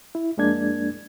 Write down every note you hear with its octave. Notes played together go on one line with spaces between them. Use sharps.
E4
F2 G#3 A#3 D4 G#6